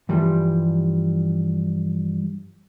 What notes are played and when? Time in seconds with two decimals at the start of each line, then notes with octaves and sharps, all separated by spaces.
0.09 G2 E3 F3 G3